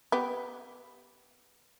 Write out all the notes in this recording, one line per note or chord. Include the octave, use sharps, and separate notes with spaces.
B3 G4